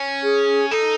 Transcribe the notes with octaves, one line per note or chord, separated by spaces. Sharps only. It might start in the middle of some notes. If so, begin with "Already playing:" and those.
Already playing: C#4
G#4
D#4 A4